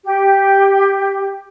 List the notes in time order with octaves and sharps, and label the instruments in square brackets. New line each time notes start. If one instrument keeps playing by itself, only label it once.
[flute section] G4